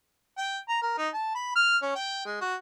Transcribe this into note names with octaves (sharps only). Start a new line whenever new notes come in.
G5
A#5
A#4
D#4
A5
B5
F6
C#4
G5
G#3
F#4